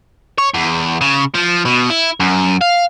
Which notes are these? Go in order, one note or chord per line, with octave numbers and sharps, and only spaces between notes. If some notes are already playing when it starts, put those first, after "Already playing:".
C#5
E2
C#3
F3
B2
E4
F#2
F5